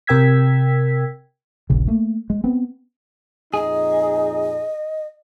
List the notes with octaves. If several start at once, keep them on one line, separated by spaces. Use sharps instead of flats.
C3 A#4 G5 E6 G#6 B6
D#1 A#1 C#3
A3 A#3
G#3
B3 C4
F2 A#2 D#4 G#4 D#5